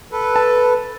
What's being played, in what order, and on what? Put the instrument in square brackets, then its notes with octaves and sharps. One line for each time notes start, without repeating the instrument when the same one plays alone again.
[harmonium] A4 B4
[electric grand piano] A5